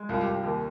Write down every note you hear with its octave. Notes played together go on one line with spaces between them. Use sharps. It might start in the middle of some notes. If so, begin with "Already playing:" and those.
Already playing: G#3
C2 F4
G4
C2
G4
D#2 G4